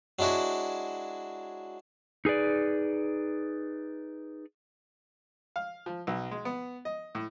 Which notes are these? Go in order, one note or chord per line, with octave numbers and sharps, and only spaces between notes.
F#3 G#3 D4 E4 F#4
D#4 G#4 B4 D5
F5
F3
B1
G#3
B3
D#5
A2